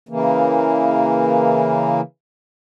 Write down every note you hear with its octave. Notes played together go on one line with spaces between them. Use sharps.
C#3 E3 A#3